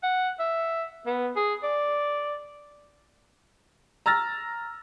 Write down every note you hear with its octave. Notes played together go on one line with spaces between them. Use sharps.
F#5
E5
B3
G#4
D5
A#5 E6 F6 A6 A#6